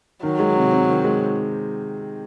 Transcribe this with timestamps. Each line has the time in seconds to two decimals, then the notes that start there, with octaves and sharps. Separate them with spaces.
0.23 D#3 F#3
0.39 G#3
0.56 C3
0.72 C4
0.89 D#3
1.04 G#3